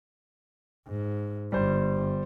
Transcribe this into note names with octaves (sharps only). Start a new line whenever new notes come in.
G#2
G1 G3 C5